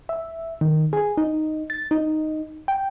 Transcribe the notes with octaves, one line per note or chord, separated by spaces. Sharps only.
E5
D#3
G#4
D#4
A6
D#4
G5